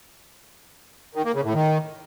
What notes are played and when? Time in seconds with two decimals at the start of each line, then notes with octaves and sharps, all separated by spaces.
1.15 D#3
1.25 A#3
1.34 C#3
1.44 A2
1.54 D#3